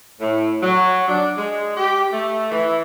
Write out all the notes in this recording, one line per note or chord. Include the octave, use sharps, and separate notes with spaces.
A2
F#3
D4
G#3
G4
A3
E3